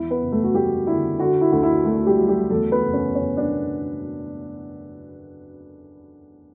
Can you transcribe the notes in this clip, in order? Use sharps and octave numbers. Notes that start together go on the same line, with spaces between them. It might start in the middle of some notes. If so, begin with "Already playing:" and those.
Already playing: E2 E4
B3 B4
F#1
A3 A4
F#4
G3 A3 G4
D3 E4
D3 F#4
E4
D2
E4
A3 F#4
G3 G4
F#3
G3 G4
E2 A3 A4
B3 B4
F#1
C#4 C#5
F#1 C#4 C#5
D4 D5
B2